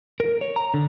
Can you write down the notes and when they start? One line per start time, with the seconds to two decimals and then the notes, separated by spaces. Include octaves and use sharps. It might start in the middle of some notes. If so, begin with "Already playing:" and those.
0.20 A#4
0.41 C#5
0.56 A#5
0.74 D3